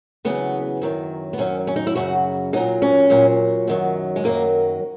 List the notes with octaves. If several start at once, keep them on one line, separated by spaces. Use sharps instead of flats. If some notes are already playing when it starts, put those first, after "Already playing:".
E2 C#3 F#3 B3
F#2 D#3 F#3
B3
F#2 D#3 F#3 C#4
C#4
D#4
E4
F#2 C#3 F#3 F#4
A#2 F#3 D#4
C#4
A#2 F#3
F#2 D#3 F#3
G#3
F#2 D#3 F#3 A#3